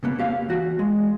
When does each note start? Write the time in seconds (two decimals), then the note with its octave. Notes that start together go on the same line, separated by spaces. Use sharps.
0.03 C#3 A#3 B3
0.19 A#3 G4 F5
0.49 E3 F#4
0.79 G#3